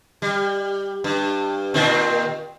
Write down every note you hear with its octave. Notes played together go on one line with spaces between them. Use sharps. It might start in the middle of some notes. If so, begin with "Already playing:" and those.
G3
G2
A#2 D#3 C4